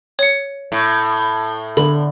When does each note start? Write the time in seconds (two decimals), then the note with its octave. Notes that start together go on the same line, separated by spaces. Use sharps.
0.19 C#5 C#7
0.72 A2
1.77 D3 B5